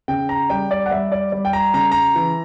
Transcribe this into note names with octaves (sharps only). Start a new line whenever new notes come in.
C#3 G5
A#5
G3 G5
D5
F#5
G3 E5
D5
G3
G5
A#5
C#3 A#5
A#5
E3